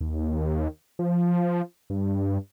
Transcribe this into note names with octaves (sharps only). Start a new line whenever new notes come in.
D#2
F3
G2